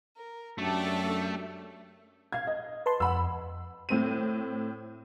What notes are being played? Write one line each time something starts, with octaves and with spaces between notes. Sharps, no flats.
A#4
F#2 A3 D4 G4 A4 D5
F5 G#6
D#5
B4 A5 C6
F2 F#5 B5 E6
A2 C4 D#7